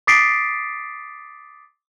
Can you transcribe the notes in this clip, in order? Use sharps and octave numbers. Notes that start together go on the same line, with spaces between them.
D6 D#6 A6 B6 C7 D7